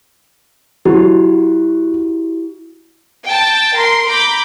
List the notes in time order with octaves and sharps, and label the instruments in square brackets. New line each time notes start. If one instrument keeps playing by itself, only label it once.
[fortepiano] F#3 [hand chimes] E4 F#4 G4
[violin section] G5 A5
A#4 C6
A#5 B5 D6 G6